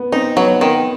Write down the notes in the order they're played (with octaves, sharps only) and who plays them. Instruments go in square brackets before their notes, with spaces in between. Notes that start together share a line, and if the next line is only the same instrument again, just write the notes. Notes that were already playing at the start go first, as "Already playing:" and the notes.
Already playing: [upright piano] B3
[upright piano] C4 [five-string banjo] D#4
[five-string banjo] F#3 [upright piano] B3
[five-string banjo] D#3